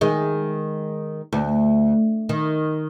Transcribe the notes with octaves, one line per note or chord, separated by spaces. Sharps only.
D#3 G#3
D2
D#3